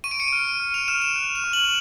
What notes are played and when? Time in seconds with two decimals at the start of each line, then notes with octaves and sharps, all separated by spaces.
0.04 C#6 D#7
0.11 D7
0.20 C#7
0.28 F6 D7
0.60 F6
0.74 F7
0.88 F6 E7
1.02 E7
1.16 F#6
1.35 F7
1.44 C#6
1.53 F#7